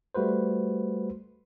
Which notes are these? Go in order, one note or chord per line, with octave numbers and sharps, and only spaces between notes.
G3 A3 F#4 B4 C5